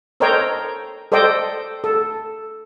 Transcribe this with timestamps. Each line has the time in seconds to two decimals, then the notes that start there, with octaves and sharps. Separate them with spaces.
0.20 A4 A#4 C5 C#5 D#5 G5
1.12 A4 C5 D5 D#5 G5
1.84 A4